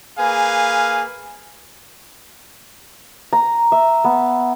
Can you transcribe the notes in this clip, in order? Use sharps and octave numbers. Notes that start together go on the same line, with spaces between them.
A#3 G#4 B4 F5 G#5
A#5
E5
B3